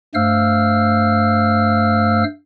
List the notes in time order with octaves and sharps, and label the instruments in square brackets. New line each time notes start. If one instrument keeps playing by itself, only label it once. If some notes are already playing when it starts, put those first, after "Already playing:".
[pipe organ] G2 A3 C5 F5 E6 F6